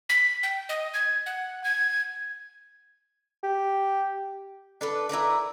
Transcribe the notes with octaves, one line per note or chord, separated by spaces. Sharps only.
B6
G5
D#5
G#6
F#5
G#6
G4
D4 A4 B4
E4 A#4 B4 D5